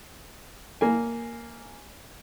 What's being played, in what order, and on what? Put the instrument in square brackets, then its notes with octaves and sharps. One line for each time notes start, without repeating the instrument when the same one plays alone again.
[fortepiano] A#3 G#5